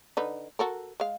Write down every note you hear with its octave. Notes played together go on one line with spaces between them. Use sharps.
D3 D#4 B4
F#4 A4 A#4
G#3 F5